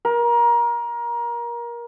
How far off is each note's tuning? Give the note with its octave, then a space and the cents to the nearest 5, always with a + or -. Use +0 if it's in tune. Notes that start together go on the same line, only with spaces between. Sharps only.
A#4 +25